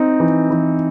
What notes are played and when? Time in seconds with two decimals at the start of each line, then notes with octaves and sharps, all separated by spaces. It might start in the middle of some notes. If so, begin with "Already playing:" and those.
Already playing: C4 D#4
0.20 E3
0.50 E3